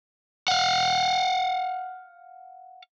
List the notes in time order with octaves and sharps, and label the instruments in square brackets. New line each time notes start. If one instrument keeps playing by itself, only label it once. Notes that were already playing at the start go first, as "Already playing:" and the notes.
[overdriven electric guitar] F5 F#5